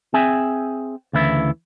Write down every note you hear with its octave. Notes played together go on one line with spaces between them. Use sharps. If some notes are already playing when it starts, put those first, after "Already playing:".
C4 G#4 E5 G#5
D2 C#3 E3 E4